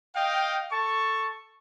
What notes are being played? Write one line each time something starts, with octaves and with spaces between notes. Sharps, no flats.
D#5 F5 G5
A4 A5 C#6